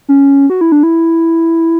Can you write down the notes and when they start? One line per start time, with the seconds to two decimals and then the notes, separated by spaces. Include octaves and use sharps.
0.09 C#4
0.50 F#4
0.61 E4
0.72 D4
0.83 E4